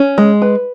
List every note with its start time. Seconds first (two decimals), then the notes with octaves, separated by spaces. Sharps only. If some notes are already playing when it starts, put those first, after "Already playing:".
Already playing: C#4
0.18 G#3
0.42 B4